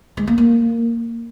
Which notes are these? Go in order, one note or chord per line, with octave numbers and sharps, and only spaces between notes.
G#3
A#3
A#3